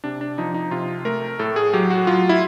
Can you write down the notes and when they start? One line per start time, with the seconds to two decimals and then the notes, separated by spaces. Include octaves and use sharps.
0.04 C3 D4
0.21 D4
0.38 F3 D#4
0.54 D#4
0.71 C3 F4
1.05 A3 A#4
1.39 A2 A4
1.56 G#4
1.73 F#3 G4
1.90 F#4
2.07 F#3 F4
2.29 E4